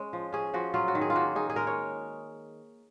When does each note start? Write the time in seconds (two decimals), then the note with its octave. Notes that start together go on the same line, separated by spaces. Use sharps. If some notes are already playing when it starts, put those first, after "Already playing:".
Already playing: G#3 C#4
0.13 F3
0.32 C#4 G#4
0.54 F3 F#4
0.74 F#3 F4
0.88 F#4
0.95 D#3
1.01 G#4
1.10 F4
1.15 A#3 F#4
1.36 D#4 G#4
1.50 G#4
1.56 G#3 A#4
1.67 C#5